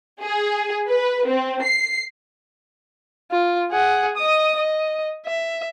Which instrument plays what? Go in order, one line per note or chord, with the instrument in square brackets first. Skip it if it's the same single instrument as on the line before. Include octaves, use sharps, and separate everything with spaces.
[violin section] G#4
B4
C4
C7
[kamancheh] F4
G#4 F#5
D#5 D#6
D#5
E5